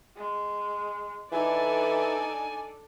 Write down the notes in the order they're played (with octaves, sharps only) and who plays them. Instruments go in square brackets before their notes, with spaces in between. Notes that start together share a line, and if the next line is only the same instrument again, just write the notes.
[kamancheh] G#3
[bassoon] E3 [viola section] D4 A4 D5 [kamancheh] D#4 [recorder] G#5